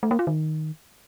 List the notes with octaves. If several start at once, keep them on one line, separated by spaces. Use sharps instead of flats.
A3
A#3
F4
D#3